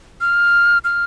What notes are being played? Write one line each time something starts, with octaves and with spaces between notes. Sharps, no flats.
F6
F6